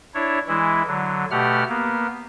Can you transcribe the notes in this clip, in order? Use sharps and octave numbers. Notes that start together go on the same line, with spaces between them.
D4 E4 C#5
E3 G#3 E4
D3 F#3
B2 A3 G4 F#5 F6
A#3 B3